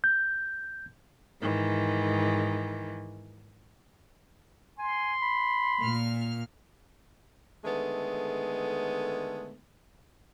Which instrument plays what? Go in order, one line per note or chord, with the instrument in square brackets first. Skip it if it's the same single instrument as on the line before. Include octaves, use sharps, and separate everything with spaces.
[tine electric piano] G6
[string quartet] G#2 D#3 E3
[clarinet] G#5 [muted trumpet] C6
[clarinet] B5
[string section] A#2 F6
[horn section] D3 D#3 G#3 A3 B3